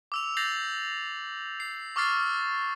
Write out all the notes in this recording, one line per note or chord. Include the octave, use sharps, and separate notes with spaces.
D6 E6 F7
G6 A6 A#6 C7 F7 F#7
C7
C#6 D6 E6 F6 A6 C7